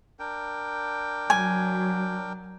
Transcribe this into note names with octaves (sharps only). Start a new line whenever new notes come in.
D4 A#4 G5
F#3 G#5